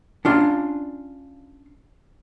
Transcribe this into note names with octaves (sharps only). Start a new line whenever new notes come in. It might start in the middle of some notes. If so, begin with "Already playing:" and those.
C#4 D4 F4